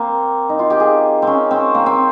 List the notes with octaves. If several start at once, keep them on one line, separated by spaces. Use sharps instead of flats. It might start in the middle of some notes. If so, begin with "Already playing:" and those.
Already playing: A#3 C4
D#4
F4
G4
G#4
C4
C#4
C4
A#3
C4